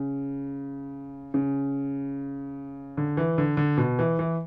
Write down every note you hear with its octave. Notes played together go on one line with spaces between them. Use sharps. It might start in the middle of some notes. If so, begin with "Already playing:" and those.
Already playing: C#3
C#3
D3
E3
D3
D3
B2
E3
E3